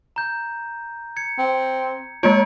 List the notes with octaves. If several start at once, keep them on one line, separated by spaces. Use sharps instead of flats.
A#5 G6
G#6 C#7
C4
G#3 A#3 F4 C#5 D7